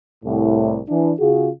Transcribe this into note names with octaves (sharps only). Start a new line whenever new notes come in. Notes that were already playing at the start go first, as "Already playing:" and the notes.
C2 A2
E3 D4
C#3 F4 F#4 G#4